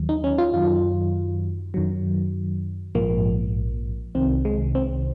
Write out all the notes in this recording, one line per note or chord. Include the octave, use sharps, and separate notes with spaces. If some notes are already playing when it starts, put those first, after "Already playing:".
Already playing: D#2 D#3 F#3
D#4
C#4
F4
F#2 D#3 F#3 F4
F#2 D#3 F#3
A#1 G#2 F3 A#3
C2 C3 D#3 C4
G#3
C4